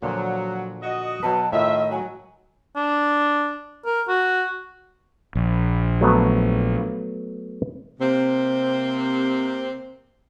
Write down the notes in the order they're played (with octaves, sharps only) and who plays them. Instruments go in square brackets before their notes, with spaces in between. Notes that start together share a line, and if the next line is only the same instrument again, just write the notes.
[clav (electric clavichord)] A#2 D3 F3 [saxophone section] F#3
[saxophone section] F#4 D#5
[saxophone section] B2 [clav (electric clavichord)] F#3 B4 [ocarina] A5
[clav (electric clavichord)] A2 D#3 [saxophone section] F4 E5 [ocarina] D#5
[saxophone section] F#3 [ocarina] G#5
[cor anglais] D4
A#4
F#4
[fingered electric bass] A#1
[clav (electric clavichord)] F#3 A3 B3
[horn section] C3 A#3 C4